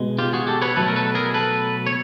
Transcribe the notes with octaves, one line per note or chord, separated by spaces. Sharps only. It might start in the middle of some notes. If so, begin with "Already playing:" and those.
Already playing: B2 G#3
F4 G4
F#4 G#4
G4 A4
B4 C#5
B2 F#3 A3 A4 B4
A#4
A4 B4
G#4 A#4
A4 B4
C#5